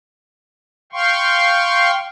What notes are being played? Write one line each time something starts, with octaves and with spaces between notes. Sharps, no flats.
F5 G5 C6 C#6